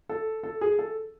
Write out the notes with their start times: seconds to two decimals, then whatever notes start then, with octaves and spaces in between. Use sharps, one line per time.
0.09 A4
0.43 A4
0.61 G#4
0.79 A4